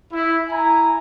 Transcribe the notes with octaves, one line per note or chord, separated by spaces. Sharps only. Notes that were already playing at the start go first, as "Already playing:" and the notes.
E4
E4 G#5 A#5